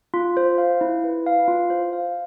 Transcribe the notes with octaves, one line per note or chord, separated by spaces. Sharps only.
F4
C5
F5
E4
B4
F5
F4
C5
F5